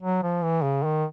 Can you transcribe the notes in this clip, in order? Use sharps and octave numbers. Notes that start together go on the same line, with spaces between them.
F#3
F3
E3
C#3
D#3